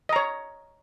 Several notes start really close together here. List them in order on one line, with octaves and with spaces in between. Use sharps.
D#5 A#5 C#5